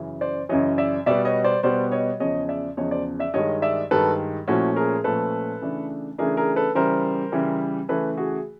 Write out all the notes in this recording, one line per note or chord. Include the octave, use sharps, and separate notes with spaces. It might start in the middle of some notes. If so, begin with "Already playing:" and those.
Already playing: F#2 C#3 E3
C5 D5
F#2 C#3 E3 C#5 D#5
D5 E5
B2 G3 B3 D5 E5
C#5 D#5
C5 D5
B2 G3 B3 C5 D5
C#5 D#5
E2 C#3 F3 C#5 D#5
D5 E5
E2 C#3 F3 C#5 D#5
C5 D5
D5 E5
G2 D#3 G#3 C#5 D#5
D5 E5
G2 D#3 G#3 A4 B4
A#2 F3 A3 C#4 E4 F#4
G#4 A#4
A#2 F3 A3 C#4 A4 B4
C#3 E3 A3 D4
C#3 E3 A3 D4 G#4 A#4
G#4 A#4
A4 B4
C#3 E3 G3 A#4 C5
C#3 E3 G3
C#3 E3 A3 A4 B4
F#4 G#4